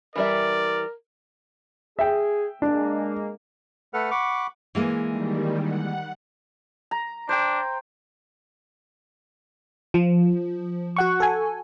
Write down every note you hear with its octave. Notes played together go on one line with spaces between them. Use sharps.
E3 G3 A#4 D5 E5
G#4 E5 G5
G#3 A#3 D4
A3 A4 B4 F#5 F6
F#5 B5 C#6 D6
E3 G#3 A#3
D#3 G3
F#5
A#5
D4 C5 G5
F3
F#4 F#5 C#6
A4 G#5